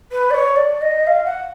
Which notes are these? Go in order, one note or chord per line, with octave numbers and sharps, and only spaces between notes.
B4
D5
C#5
D5
D#5
F5
F#5